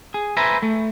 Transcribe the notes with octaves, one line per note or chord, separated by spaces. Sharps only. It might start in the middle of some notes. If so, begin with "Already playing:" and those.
G#4
B4 C5 E5 G#5 A#5 B5
A3